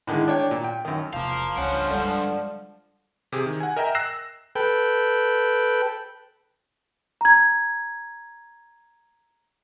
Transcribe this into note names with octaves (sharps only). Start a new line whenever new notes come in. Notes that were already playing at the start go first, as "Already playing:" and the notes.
A2 D3 D#3 G#3
D4 C#5 G5
A#2
G5
F#2 D#3
E1 C3 F3 A#4 F5
C#2 G2 C#4 F#5
D3 G3 G#3
C3 G4 G#4
D#3
F#5 G#5
A#4 D#5 E5 G5 A#5
E6 F#6 A#6 C7 E7
A4 B4 G5
A#5 G#6